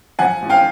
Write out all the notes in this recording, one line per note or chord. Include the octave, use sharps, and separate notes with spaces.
F3 F#5 G#5
A1
F5 G5